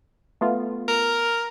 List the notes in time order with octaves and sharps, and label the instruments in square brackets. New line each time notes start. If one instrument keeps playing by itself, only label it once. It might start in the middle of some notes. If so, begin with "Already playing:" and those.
[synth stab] A3 B3 F4
[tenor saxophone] A#4